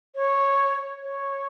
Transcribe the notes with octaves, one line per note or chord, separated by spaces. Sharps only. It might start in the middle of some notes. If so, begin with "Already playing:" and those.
C#5
C#5